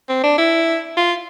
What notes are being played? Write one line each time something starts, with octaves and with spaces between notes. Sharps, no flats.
C4
D4
E4
F4